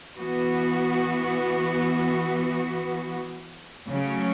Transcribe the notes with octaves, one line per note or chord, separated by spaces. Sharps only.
E3 B3 F#4
C#3 F#3 A3 C#4